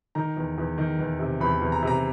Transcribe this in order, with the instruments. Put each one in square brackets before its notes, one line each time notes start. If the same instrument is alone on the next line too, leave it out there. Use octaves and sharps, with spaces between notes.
[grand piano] D#3 A#5
E2
E2
D#3
E2
C3
E2 B5
E2
A#5
C3 A#5